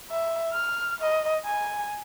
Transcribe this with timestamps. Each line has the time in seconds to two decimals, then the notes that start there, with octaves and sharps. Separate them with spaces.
0.11 E5
0.52 F6
1.01 D#5
1.45 G#5